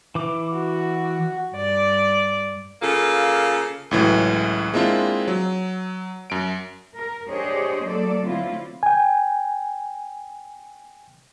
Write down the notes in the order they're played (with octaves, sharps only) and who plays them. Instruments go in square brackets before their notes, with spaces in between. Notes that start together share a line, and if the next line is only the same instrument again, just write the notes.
[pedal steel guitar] E3 D6
[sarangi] F#4
[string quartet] G2 D5
[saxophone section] C#3 A#3 F4 A4
[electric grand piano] C#2 A2 E3 F#3
G#3 A#3 C4 D4 E4 F4
F#3
F#2 D7
[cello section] A#4
D4 G4 G#4 C5 C#5 D#5
F#3 A#3 A4 D5
D3 F#3 A3 C4 E4 F4
[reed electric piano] G5 G#5